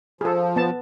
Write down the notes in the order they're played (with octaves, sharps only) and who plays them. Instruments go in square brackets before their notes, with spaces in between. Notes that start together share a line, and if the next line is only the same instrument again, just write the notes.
[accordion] F3 [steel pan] G#4 A4
[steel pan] B3 A5